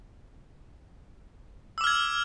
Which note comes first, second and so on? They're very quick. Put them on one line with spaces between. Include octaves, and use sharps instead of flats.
E6 D6 F6 G#6